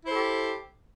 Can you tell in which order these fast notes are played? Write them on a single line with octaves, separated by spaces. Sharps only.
E4 C5 A4 G4